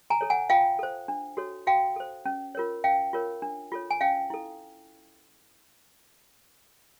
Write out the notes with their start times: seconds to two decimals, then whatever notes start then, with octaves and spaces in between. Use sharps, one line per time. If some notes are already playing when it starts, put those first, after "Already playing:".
0.10 G#5 A#5
0.21 A4 C#5
0.30 F#5 G#5
0.50 F4 F5 G5
0.79 A4 C5
1.08 D4
1.37 F#4 A4 C#5
1.67 F#4 F5 G5
1.96 A4 C5
2.25 C#4
2.55 F4 A#4 C#5
2.84 C#4 F5 G5
3.13 F4 A#4 C#5
3.42 D4
3.72 F4 A4 C#5
3.91 G#5
4.01 C#4 F5 G5
4.30 E4 A4